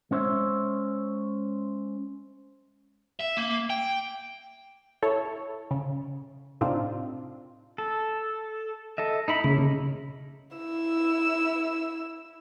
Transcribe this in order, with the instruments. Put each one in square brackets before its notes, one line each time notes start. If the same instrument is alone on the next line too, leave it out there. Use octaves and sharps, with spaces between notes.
[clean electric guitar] G#3 C#4 C5 C#5 E5
[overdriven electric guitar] E5
A#3
G5
[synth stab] E4 A4 C#5
C#3
A2 C3 C4 D4 D#4 F4
[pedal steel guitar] A4
A4 D#5 E5
D#4 E4 B5
[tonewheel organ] C#3 [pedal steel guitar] A#3 C#4
[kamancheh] E4 E6